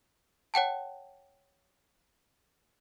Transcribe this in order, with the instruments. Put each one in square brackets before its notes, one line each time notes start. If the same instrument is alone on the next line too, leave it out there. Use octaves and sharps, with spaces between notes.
[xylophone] C#5 F#5 G5 A5